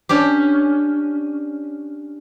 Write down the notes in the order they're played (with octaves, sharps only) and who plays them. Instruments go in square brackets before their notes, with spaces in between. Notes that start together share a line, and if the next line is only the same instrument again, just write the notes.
[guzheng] C#4 D4 G4